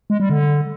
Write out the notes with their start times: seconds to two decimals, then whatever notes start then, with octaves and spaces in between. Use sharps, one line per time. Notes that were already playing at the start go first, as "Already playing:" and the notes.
0.10 G#3
0.20 G3
0.30 D3